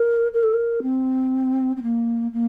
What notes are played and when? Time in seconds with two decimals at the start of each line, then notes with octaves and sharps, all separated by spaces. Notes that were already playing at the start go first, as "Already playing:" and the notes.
Already playing: A#4
0.33 A#4
0.43 A4
0.53 A#4
0.82 C4
1.77 C4
1.83 A#3
2.33 A#3